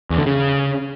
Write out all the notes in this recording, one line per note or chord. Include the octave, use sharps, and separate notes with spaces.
E2
D3
C#3